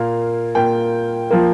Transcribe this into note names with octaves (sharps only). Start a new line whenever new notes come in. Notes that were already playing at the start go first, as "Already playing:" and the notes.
Already playing: A#2 A#3 F5
A#2 A#3 G5
F3 A#3